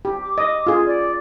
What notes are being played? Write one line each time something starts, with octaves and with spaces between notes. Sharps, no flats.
G4
D6
D#5
F4 G#4
D5